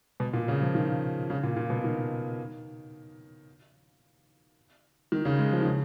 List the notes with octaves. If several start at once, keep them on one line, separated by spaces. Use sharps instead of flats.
B2
A#2
C#3
F3
D#3
C#3
A#2
A#2
B2
D#3
D#3
C#3
G#3
F3
D#3
C#3